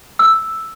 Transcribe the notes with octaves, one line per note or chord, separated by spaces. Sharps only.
E6